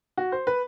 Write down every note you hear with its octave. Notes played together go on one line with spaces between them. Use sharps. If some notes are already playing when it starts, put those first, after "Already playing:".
F#4
C5
B4